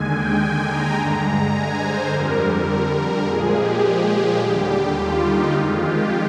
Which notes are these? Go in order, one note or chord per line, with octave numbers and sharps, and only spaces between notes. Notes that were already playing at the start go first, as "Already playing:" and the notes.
Already playing: D#2 D3 G#3 G#5
G5
G#5
A#5
G2 D3 G#3
G#5
C5
F2 D3 G3 A#4
A#2 F3 G#3 G#4
G4
G4
D#2 D3 G3
F4
D#4
F2 D#3 G#3 F4
G4